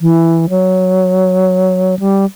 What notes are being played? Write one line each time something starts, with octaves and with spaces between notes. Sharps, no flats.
E3
F#3
G3